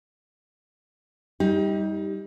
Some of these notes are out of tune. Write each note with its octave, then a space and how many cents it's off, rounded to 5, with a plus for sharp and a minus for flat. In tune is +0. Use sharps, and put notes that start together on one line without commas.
G3 +0 D#4 +30 G4 +5